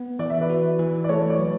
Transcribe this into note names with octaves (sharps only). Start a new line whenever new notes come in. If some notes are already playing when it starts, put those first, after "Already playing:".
Already playing: B3
E3 D5
E5
B4 D5
F#4
E3
D5
A3 A4 C#5
C#5
B4 D5
F#3